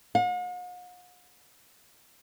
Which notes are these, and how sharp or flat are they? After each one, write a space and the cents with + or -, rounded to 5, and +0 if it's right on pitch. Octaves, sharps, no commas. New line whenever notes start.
F#5 -45